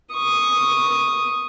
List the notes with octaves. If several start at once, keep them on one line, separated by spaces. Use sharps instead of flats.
C#6 D#6